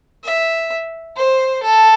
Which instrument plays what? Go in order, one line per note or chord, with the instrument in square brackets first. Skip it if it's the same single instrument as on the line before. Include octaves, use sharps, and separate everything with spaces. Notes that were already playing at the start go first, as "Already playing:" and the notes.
[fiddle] E5
C5
A4